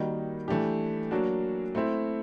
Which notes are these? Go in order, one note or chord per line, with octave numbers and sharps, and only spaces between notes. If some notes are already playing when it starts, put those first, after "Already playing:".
Already playing: D#3 G3 A#3 D#4 F#4
E3 A3 D4 G4
F#3 A#3 D4 F#4
A3 C4 E4